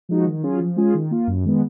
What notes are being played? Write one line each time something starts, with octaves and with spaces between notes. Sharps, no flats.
F3 G#3 D#4 F#4
D#3
F#3 C#4 F4 G#4
F3
G#3 C#4 F4 G#4
D#3
A#3 F4
F#2
D#3 G#3 B3